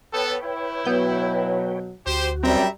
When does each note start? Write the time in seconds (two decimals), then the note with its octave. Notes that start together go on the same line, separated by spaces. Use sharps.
0.13 B3 A4 B4 C#5 G5
0.44 E4
0.85 B2 F#3 B3 G6
2.06 D2 F#4 G4 C5
2.44 F#2 G3 C4 E5 G5 A#5